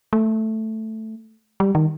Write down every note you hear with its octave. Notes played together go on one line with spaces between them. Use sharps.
A3
G3
D#3